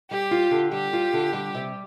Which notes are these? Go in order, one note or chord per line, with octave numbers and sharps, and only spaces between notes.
G3 G4
F4
D3
G3 G4
F4
D3
G3
C3